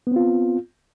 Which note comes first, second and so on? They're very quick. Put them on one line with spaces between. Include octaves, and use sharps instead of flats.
B3 C4 F4